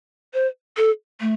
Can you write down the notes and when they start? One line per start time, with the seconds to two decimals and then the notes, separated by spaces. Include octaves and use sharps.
0.34 C5
0.77 A4
1.21 A3